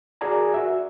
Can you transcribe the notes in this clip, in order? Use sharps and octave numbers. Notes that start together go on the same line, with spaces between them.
F#4 G#4 A#4 D5 G#5 A#5
F#4 E5